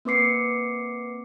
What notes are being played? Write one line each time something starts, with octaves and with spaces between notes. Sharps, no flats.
A#3 C4 B4 D6 C7 C#7